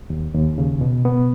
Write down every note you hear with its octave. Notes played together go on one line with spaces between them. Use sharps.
D#2
D#2
C#3
B2
B3